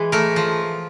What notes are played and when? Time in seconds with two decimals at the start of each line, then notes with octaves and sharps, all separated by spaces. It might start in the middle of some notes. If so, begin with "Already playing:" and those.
Already playing: E3 G#3
0.12 A3 A#4
0.36 F3